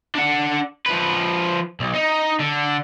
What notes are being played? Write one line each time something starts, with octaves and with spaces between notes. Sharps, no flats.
D4 F#5
F3 B4
B1
D#4
D3